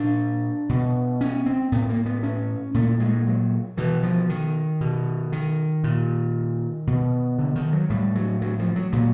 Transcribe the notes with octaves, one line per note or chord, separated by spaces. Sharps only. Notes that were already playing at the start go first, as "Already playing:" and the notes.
Already playing: A#2 D4
B2
C#4
C4
A2 B3
A#3
B3
C#4
A#2 A3
G#3
F#3
B2 E3
F3
D#3
B2
D#3
A#2
B2
D3
D#3
F#3
A2 G3
F#3
F#3
F3
F#3
A#2 F#3